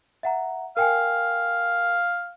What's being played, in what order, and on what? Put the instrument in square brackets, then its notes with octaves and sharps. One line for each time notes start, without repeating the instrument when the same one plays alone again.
[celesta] E5 F#5 A#5
[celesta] A#4 G5 G#5 [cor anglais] F5